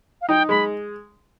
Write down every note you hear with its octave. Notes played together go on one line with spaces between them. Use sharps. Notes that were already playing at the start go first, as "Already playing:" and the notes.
F5
D#4 G5
G#3 B5